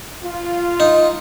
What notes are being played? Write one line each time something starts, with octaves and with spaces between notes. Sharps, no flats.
F4
D#4